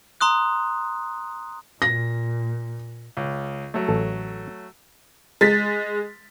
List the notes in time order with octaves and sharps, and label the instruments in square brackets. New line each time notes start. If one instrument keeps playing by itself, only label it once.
[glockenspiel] A#5 C6 D#6 F#6
[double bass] A#2 [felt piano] A#6
[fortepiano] C#2
F#3 A3
[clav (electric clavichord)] A1 A4
[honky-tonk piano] G#3 A6 B6